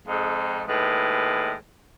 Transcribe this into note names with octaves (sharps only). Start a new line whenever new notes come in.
F2 G#2
D#2 A2 G#3 B4